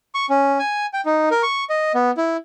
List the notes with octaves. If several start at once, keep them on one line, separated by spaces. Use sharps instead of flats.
C#6
C#4
G#5
G5
D#4
A#4
C#6
D#5
B3
E4